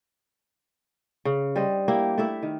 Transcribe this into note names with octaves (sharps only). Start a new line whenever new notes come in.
C#3
G3 D4 C5 D#5
A#3 E4 G4
A3 E4 E5
D#3